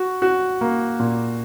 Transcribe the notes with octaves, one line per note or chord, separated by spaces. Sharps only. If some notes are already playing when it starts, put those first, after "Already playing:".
Already playing: F#4
F#4
A#3
A#2